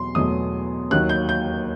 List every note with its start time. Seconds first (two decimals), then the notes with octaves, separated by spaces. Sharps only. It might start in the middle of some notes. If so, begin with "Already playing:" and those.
Already playing: E2 B2 F#3 C6
0.15 E2 B2 F#3 A3 D#6
0.91 D#2 D#3 F#3 F#6
1.09 G6
1.29 G6